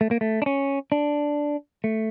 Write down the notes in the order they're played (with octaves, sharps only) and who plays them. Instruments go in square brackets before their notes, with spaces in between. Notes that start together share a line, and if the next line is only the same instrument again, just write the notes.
[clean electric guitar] A3
A#3
A3
D4
C#4
D4
A3